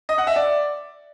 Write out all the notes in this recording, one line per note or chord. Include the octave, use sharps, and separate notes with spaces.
D#5
F#5
E5
D5